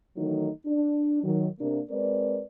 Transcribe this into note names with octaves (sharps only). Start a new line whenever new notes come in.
D#3 E3 F#3 A3 D#4
D4
D#3 F#3
C3 A#3 D4
G#3 C4 A#4 B4 D5